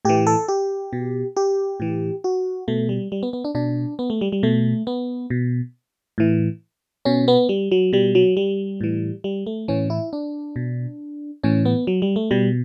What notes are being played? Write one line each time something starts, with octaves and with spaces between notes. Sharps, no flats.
A2 E3 G4
A4
G4
B2
G4
A2 E3
F#4
B2 A3
G3
G3
B3
B3
D4
B2 D4
B3
A3
G3
G3
B2 A3
B3
B2
A2 E3
B2 C#4
B3
G3
F#3
B2 G3
F#3
G3
A2 E3
G3
A3
A2 E3 C#4
E4
D4
B2
A2 E3 C#4
B3
F#3
G3
A3
B2 G3